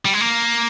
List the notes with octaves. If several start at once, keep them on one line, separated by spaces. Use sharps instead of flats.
G3
G#3
A#3